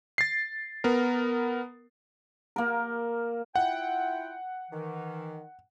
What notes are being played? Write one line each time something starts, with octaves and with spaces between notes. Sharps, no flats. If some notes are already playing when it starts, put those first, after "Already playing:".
A6 C7
B3 A#4
A#3 A#4
E4 F4 F#5 G5
D#3 E3